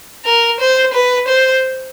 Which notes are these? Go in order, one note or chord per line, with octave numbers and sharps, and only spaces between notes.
A#4
C5
B4
C5